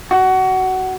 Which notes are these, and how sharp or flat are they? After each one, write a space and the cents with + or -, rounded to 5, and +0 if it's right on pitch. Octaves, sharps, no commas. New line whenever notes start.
F#4 +20